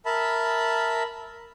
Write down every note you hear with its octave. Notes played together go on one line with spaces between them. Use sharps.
A#4 E5 A5 B5